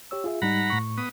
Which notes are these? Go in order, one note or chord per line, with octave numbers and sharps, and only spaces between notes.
G4 C#5 E6
F4 G#4 E5
G#2 G3 D#4 F#5 A#5 B5
A2 C#6
B3 D#6